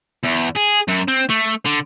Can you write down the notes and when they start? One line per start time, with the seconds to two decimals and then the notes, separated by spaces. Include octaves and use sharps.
0.23 E2
0.56 G#4
0.88 F#2
1.08 C4
1.29 A3
1.65 D3